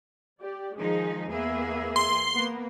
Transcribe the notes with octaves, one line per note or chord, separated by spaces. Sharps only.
G4 D5
D#3 F3 G#3 D#4 G#4
E2 A#3 B3 G#4 E5
C6
A#3 B3